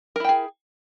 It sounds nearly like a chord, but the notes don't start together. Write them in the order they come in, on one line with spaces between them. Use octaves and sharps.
A#4 E4 G5 G#4